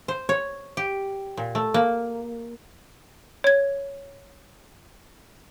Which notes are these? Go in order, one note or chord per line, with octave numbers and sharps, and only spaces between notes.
C5
C#5
G4
A#2
A3
A#3
C#5 G#6